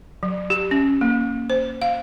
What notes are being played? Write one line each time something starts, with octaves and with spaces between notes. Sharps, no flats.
F#3
G4
C#4
A#3
C5
F5